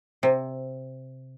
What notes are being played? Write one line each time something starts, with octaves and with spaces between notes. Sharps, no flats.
C3